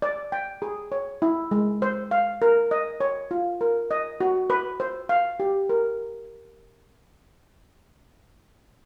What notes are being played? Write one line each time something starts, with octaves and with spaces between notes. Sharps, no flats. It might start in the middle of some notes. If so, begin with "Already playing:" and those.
D5
G5
G#4
C#5
E4
G#3
C5
F5
A#4
D#5
C#5
F4
A#4
D#5
F#4
B4
C5
F5
G4
A#4